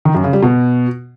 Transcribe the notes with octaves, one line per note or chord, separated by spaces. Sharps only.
D#3
F#2
C#3
G3
B2